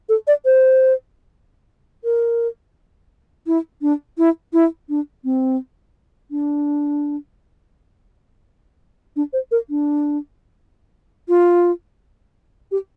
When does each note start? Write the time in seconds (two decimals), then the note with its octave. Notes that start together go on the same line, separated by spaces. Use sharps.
0.09 A4
0.27 D5
0.45 C5
2.04 A#4
3.47 E4
3.82 D4
4.18 E4
4.53 E4
4.89 D4
5.24 C4
6.31 D4
9.16 D4
9.33 C5
9.51 A#4
9.70 D4
11.29 F4
12.71 G4